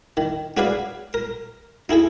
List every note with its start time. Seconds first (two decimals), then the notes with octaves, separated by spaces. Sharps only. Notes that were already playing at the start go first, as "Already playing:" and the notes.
0.17 D#3
0.57 C#4 F#4 G#4 B4 D5 F5
1.14 A#4
1.89 D#4 E4 G#4 A4